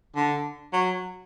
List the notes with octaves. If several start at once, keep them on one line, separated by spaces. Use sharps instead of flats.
D3
F#3